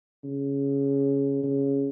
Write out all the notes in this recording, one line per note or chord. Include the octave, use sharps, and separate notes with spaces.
C#3
C#3